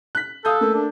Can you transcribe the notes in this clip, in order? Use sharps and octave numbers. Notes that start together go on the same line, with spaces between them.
F#6 B6
A4 F5 D#6 G6
A3 A#3
D4